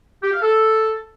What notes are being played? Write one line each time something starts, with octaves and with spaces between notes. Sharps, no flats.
G4
F5
A4